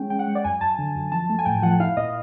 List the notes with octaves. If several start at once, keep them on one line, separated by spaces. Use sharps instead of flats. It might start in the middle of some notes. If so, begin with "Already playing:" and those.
Already playing: G#3 C#4 G5
G#3 G5
F#5
G#3
D5
F#2 G#5
F#2 A5
D3
F#2
F3 A5
A3
G#5
A2 G5
F3 F#5
E4 F5
A#2 D#5